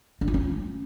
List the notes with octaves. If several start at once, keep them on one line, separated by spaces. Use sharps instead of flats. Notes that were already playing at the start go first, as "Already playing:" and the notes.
D4
F4
C#4